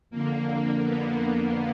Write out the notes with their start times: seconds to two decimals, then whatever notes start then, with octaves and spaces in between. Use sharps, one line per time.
0.10 F2 D3 A#3
0.83 B3
1.19 A#3